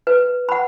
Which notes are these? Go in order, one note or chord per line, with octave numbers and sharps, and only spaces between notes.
B4
F#5 B5